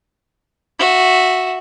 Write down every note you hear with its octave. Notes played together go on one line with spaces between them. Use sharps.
F#4 E5